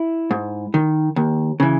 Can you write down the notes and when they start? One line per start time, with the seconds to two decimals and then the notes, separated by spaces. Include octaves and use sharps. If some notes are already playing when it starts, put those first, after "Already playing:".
Already playing: E4
0.31 G#2
0.74 D#3
1.16 D#2
1.60 C#3 E3